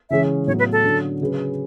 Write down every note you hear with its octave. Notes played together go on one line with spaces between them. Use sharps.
C#3 E3 G#3 C#4 G#4 E5
A2 F#3 B3 E4 C#5
B4
A4
D3 F#3 C#4 F#4
C#3 F#3 C#4 G#4 B4